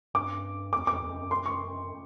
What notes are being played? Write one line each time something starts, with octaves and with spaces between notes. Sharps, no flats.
G2 D6
F2 D6
F2 D6
E2
F2
F#2
C6
C#6